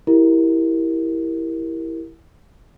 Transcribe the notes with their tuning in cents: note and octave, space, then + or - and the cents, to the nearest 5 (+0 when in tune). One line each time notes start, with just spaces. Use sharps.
E4 +0 G4 +0 A#4 +0